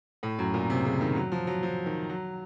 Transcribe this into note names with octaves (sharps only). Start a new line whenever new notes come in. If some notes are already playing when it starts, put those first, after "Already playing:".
A2
F#2
A#2
C3
C#3
D#3
F#3
F3
F#3
F3
D#3
F#3